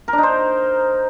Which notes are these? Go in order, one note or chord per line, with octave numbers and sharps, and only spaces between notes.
A#4
D4
D#4
C5